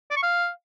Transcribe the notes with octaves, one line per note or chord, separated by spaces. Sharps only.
D5
C#6
F5